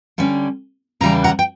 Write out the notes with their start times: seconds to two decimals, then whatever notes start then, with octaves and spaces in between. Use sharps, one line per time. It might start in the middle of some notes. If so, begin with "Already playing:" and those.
0.18 D3 G3 C#4
1.01 E2 C#3 E3 G3 A#5
1.24 F#5 A#5
1.39 G5